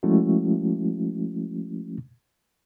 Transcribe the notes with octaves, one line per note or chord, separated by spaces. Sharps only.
F3 G#3 A3 C#4 E4 F#4